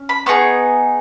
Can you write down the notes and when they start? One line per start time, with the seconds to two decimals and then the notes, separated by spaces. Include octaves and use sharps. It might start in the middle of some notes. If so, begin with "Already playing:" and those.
Already playing: C#4
0.09 B5
0.26 B3 D#4 G#4 C#6